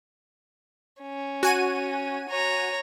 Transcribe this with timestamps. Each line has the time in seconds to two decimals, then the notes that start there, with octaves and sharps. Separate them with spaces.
1.01 C#4
1.43 F#4 G#5 D#7
2.29 C#5 A#5